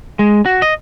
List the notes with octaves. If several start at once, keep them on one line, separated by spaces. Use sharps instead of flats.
G#3
F#4
D#5